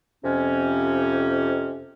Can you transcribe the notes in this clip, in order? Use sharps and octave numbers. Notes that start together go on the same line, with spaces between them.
F2 C3 C#4